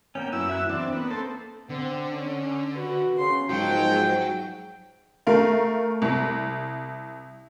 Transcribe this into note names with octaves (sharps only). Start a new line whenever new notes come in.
A#3 B3 C#4 G5
F#2 E4 E6
E5 F#6
E2 C4 D4
A#3 B3
C4 A4
D3 C4
C#4
F#4 B4
C#3 C6
G#2 F3 F#3 G5
A3 A#4 F5
C2